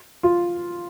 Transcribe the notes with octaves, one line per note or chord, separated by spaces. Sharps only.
F4